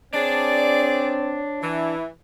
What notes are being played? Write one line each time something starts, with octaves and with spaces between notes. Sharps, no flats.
C4 D4 G#4 C#5 D5
E3 E4